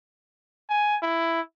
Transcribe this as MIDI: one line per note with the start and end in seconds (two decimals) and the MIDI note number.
0.70 0.97 80
1.03 1.41 64